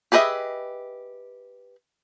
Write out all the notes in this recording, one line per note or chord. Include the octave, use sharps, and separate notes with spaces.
G4 G#4 B4 D#5 E5